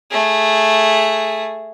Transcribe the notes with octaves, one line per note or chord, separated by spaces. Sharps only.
A3 G#4